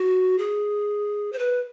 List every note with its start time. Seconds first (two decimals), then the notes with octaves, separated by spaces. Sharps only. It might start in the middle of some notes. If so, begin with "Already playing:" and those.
Already playing: F#4
0.38 G#4
1.32 C5
1.39 B4